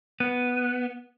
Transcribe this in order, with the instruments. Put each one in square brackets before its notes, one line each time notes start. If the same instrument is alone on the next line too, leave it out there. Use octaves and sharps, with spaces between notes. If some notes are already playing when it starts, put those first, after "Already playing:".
[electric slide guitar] B3